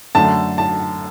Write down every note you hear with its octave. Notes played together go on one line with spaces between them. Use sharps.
F#2 D3 A3 A5
A5